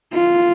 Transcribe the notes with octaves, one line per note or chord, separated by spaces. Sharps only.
F4